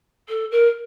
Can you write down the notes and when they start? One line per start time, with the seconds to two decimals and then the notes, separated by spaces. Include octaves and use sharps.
0.28 A4
0.51 A#4